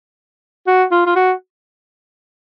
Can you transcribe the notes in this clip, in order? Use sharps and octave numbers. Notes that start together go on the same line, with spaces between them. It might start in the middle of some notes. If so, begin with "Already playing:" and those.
F#4
F4
F4
F#4